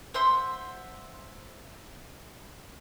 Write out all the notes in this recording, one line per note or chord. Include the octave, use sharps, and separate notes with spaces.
C5 E5 F#5 C6